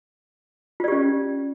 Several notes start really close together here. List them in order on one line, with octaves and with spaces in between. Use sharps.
F4 D5 G4 C#4